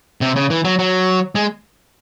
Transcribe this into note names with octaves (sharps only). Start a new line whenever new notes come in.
C3
C#3
E3
F#3
F#3
G#3